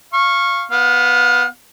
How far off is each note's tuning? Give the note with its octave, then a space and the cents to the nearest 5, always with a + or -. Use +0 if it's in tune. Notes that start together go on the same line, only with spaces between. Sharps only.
F5 -5 C#6 -15
B3 +0 F5 +30